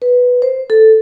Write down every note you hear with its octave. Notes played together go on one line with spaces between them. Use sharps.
B4
C5
A4